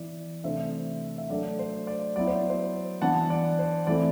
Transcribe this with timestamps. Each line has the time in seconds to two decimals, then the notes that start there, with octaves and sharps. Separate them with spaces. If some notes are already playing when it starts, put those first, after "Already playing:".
Already playing: E3 B3 E4 D5
0.44 C3 E3 A3 D4 C5 E5
1.18 E5
1.29 F#3 A3 D4 D5
1.59 C5
1.87 D5
2.16 F#3 B3 E4 D5
2.27 C5
2.50 C5
3.02 E3 B3 D4 F#5 A5
3.30 D5
3.59 C5
3.87 E3 A3 C4 E4 D5